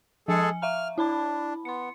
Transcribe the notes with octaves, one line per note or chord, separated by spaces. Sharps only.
F3 G#3 G#4 A4 C#7
G#5
E5 F5 A#5 F6
D4 E4 A5 B5
B3 C6 C#7